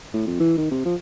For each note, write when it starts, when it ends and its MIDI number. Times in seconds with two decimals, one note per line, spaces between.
0.14 0.26 45
0.27 0.38 41
0.40 0.53 52
0.57 0.69 51
0.71 0.84 48
0.85 0.95 53